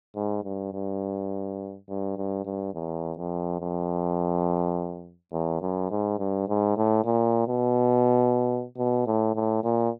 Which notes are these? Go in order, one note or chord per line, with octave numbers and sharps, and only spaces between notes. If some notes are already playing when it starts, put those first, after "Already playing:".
G#2
G2
G2
G2
G2
G2
E2
F2
F2
E2
F#2
G#2
G2
G#2
A2
A#2
B2
B2
A2
A2
A#2